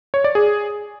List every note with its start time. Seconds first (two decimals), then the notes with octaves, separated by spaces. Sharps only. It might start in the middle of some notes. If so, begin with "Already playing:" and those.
0.14 C#5
0.24 D5
0.35 G#4